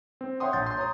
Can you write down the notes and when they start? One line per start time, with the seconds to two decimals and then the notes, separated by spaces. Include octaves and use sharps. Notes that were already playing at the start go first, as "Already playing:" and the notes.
0.21 C4
0.40 C#5 E5 F#5 G5 C6 D#6
0.53 A#1 G6 A6
0.66 C6 G6
0.78 C#5 A#5 C6 D#6